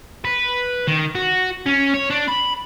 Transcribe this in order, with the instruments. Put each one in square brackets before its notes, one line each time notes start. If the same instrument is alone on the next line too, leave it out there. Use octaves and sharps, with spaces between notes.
[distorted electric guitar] B4
D#3
F#4
C#4
C#5
D4
B5